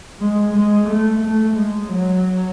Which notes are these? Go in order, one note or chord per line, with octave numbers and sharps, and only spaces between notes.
G#3
G#3
A3
A3
G#3
F#3